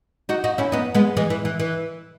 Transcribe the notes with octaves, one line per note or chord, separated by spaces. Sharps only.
D#4 F#4
D#4 F#4
C#4 E4
B3 D#4
G#3 B3
E3 G#3
E3
E3
E3